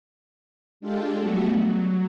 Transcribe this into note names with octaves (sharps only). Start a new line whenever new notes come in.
G#3 D4 F4 G4 A4
F#3 G3 A3 B3 F#4
F#3